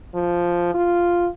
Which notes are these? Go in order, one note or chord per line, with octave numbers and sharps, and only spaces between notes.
F3
F4